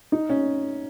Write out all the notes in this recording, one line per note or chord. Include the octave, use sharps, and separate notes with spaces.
D#4
C#4